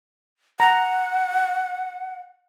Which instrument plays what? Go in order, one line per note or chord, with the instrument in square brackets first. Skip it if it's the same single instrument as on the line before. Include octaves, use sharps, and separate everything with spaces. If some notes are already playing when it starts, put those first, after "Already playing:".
[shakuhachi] F#5 [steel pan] A#5